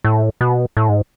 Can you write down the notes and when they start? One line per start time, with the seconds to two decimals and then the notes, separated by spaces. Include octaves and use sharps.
0.04 A2
0.41 B2
0.77 A2
0.89 G#2